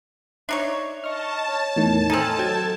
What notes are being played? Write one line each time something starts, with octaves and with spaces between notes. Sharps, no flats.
D4 D#4 C#5 E5
D#5 A5 C#6 F6
C#5
E2 A2 D#3
C4 D#4 A4 G#5 D#6 F6
F#3 G5 G#6